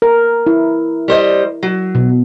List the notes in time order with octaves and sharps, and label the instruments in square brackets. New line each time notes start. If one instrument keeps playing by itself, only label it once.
[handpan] A#4
E4
[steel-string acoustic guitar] G3 C5 D#5
F#3
[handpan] B2